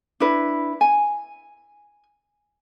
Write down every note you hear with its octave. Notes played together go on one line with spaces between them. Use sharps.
D4 E4 B4
G#5